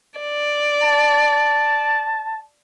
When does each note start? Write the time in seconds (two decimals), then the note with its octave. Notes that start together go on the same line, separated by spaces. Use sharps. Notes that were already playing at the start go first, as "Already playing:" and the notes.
0.20 D5
0.83 A5